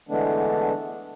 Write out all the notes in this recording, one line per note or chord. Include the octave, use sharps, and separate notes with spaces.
D3 E3 G#3 A3 B3 D4